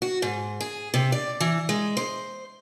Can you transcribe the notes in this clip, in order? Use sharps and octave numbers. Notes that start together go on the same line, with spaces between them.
F#4
G#2
G#4
C3
D5
E3
G#3
C5